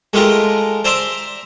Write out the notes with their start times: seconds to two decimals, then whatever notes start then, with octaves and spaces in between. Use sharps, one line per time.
0.13 G#3 A3 F4 G4 A#4
0.84 C5 D5 E5 A#5 C6 D6